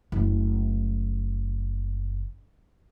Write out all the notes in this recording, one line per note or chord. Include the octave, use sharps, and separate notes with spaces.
F#1 A3